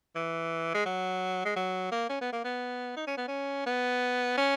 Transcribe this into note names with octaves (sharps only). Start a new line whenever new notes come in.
E3
G#3
F#3
G#3
F#3
A#3
C#4
B3
A#3
B3
D#4
C#4
B3
C#4
B3
C#4